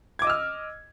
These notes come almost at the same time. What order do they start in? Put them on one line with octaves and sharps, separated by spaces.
G#6 D6 D#5 E6 F6